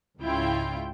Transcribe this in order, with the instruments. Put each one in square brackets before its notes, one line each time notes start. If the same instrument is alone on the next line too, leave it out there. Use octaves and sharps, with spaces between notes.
[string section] C#2 G#2 C#3 E4 F4 G5